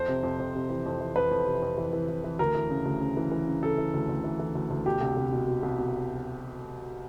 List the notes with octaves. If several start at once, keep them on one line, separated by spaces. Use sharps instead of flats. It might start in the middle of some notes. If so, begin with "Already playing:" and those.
Already playing: F2 C5
C3
F2
F2
C3
E3
F2
E3
F2 B4
F2
C3
F2
E3
E3
E3
E3
D2 A#4
E3
C#3
D2
C#3
E3
E3
C#3
C#3 A4
E3
D2
D2
E3
E3
D2
D2
B2 G4
C2
C2
B2
B2
C2
B2